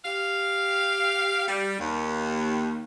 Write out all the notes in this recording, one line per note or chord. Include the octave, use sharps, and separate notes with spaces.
G4 F5
G3
D#2